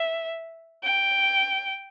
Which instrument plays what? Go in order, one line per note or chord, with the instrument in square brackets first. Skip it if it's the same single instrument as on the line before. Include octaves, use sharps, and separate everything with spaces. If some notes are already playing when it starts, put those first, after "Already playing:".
Already playing: [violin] E5
G5